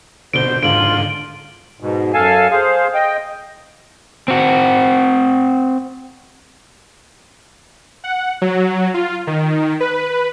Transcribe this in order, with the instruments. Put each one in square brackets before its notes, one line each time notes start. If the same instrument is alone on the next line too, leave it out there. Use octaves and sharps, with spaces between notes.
[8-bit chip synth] B2 D3 [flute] C5 [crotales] D7 G7
[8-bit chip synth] G#2 D3 [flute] F4 [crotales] D7 F#7
[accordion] G#2 B2
F#2 A4 F5 G#5 A5
G#4 C5 F5
D#5 G5
[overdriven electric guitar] C4 F#4
[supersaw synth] F#5
F#3
F4
D#3
B4